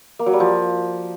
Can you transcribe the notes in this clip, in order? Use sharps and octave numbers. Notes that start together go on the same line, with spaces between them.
A#3
F#3
G3
F3